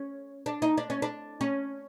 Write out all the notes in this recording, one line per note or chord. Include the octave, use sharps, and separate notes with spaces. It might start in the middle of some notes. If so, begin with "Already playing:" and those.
Already playing: C#4
D4
D#4
D4
C#4
D4
C#4